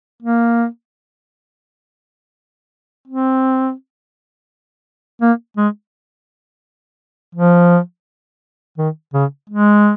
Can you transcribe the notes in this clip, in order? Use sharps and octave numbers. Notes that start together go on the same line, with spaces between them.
A#3
C4
A#3
G#3
F3
D#3
C#3
G#3